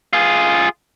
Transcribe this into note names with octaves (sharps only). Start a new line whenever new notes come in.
F4 G#4